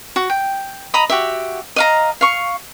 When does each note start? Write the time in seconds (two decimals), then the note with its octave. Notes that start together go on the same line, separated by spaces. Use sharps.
0.16 F#4
0.30 G5
0.94 D#5 A#5 B5 D#6
1.10 F#4 G4 E5
1.76 D#5 F5 A#5
2.21 F5 C#6